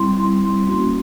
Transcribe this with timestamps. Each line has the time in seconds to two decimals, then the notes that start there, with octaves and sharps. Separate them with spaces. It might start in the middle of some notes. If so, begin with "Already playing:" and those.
Already playing: G3 C4 E4 C6
0.17 G3 C4 E4
0.67 A#3 C#4 F#4